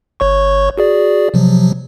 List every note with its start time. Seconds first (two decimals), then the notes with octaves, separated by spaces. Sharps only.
0.20 G1 C#5 C#6
0.78 F#4 G#4 D5
1.34 C3 F3 F#3